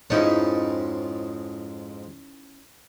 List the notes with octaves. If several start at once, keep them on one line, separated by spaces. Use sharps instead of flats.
F2 G#2 C#4 D#4 E4 A5